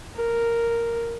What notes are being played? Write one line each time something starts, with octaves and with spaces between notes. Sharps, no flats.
A#4